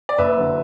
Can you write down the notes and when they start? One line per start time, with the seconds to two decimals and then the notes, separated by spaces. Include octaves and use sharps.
0.09 D5
0.18 F#1 B4 E5
0.37 D3 F#3